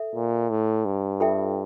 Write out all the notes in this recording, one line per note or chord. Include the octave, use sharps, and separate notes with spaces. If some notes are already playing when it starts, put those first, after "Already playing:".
Already playing: A4 E5
A#2
A2
G2
F4 A4 E5 G5